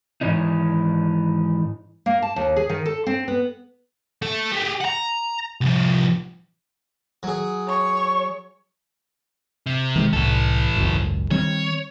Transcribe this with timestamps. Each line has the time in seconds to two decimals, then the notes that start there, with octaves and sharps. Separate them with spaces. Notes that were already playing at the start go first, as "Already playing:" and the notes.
0.21 G#2 D#3 E3 C#4 D#4
2.06 A#3
2.22 A5
2.36 D#2
2.56 G#4
2.69 D#3
2.86 A4
3.07 C4
3.28 B3
4.22 A3 A4
4.52 G4 G#4
4.81 F#5 A#5
5.61 C2 F3
7.23 F#3 G#4
7.68 C#5 C#6
9.66 C3
9.96 D#3 G#3
10.13 C2 A2 E3 A4
10.76 G#1 C#2 F#2
11.31 D#3 G3 C4 C#5